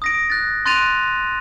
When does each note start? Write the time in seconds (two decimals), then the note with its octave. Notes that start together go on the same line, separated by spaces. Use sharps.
0.02 D#6 A#6 D7
0.30 F#6 A6
0.66 C6 F#6 A6 D7 D#7 F7